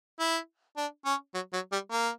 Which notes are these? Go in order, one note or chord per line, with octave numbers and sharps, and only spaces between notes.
E4
D4
C#4
F#3
F#3
G3
A#3